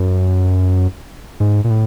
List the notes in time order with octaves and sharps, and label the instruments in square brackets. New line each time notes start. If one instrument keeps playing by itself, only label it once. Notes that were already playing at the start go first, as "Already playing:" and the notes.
Already playing: [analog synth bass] F#2
G#2
A#2
A2